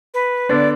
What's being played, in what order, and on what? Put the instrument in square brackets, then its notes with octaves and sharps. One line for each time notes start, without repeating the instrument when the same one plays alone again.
[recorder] B4
[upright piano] D3 B3 D4 [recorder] D5